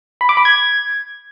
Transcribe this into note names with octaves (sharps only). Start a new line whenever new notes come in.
B5
D6
B5
G#6